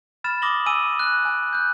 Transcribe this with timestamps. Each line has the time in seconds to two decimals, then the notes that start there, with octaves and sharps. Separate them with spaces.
0.24 B5 F6 A6 E7
0.42 D6 D#6 A#6 F#7 G7
0.66 G#5 D#6 E6 D#7
0.99 F#6
1.25 G#5
1.53 F#6 G6